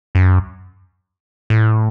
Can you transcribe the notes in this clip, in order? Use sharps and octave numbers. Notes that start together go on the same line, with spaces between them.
F#2
A2